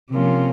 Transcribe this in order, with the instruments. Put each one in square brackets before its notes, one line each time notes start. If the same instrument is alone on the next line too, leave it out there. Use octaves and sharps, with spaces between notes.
[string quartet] C3 F3 A#3 C#4 F4